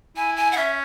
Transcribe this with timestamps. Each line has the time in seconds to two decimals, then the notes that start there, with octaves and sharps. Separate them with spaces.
0.16 E4 G#5
0.37 G#5
0.52 F#5
0.57 C#4 E5